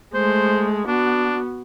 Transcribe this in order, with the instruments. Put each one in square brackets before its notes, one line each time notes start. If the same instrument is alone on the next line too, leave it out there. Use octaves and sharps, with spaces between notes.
[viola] G#3 A3 [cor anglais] C5
[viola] B3 F#4 [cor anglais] D4